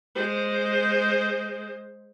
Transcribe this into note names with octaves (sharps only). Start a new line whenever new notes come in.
G#3 C5